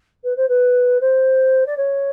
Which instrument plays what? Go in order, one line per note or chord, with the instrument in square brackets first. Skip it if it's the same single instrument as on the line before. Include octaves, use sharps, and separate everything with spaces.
[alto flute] B4
C5
B4
C5
D5
C#5